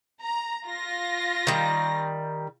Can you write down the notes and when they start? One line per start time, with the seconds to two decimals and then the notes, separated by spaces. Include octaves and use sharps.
0.22 A#5
0.66 F4 A#6
1.47 D#3 G3